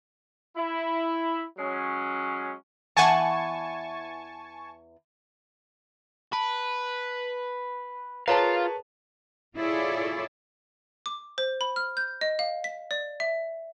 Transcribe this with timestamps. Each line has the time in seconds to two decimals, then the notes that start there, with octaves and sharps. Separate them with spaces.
0.56 E4
1.57 F#3 G#3 C#4
2.96 E2 E3 F#5 G#5 A5 C#6
6.33 B4 A5
8.28 F4 G#4 A#4 B4 C#5 F5 A5 A#5
9.56 E4 F4 G#4 A4 C#5 D5
11.06 D6
11.38 C5
11.61 B5
11.76 F6
11.97 G6
12.21 D#5
12.39 F5
12.64 B6
12.91 D5
13.20 E5